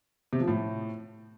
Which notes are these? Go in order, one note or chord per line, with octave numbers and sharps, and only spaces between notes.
C3
F3
A2